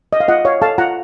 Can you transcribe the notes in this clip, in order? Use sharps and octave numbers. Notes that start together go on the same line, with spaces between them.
D#5
F5
F4 D#5 F#5
C#5 F5
A4 F5 A5
F4 F#5 A#5